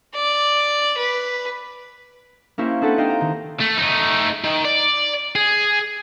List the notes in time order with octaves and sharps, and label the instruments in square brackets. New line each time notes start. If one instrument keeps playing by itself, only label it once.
[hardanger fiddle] D5
B4
[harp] A#3 C#4 E4 G4 C5
C4 D4 G4 A4 B4 F#5
D#4 C5 D#5 F5 G5
A#5
D#3
[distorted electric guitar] A3
A3 D#4
D#3
D5
G#4